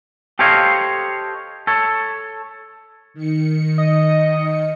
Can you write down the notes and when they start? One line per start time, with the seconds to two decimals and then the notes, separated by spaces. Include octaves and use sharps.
0.39 G4 A4 C5 C#5 D#5 F5
1.67 A4 C#5
3.14 D#3 C#7
3.78 D#5